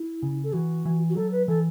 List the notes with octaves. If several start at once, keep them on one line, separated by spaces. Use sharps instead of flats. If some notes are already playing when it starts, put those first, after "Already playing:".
Already playing: E4
C#3
A4
E3 F#4
E3
F#4
F#3 A4
B4
E3 A4